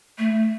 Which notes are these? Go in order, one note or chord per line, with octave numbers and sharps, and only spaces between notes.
A3